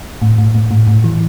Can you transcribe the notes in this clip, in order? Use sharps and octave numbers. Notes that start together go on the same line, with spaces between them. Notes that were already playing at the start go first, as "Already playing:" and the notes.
A2
A2
A2
A2
A2
E3